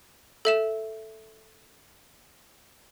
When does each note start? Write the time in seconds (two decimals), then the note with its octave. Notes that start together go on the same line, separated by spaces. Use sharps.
0.45 A4 E5 E7